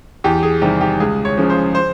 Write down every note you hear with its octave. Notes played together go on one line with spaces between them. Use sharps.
E2 G4
G#4
C3 D#3 G3 G4
G4
C#2 G#4
C#5
C#3 F3
C5
C5